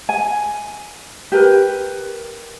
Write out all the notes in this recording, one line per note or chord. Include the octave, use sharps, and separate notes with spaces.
G#5
G4 A#4 B4